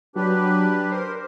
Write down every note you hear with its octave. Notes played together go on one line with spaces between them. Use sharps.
F#3 D4 G4 B4
A#4 C5